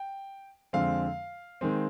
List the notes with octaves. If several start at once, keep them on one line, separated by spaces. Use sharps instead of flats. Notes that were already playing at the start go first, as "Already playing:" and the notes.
Already playing: G5
F2 D3 G#3 C4 F5
D#3 G#3 C4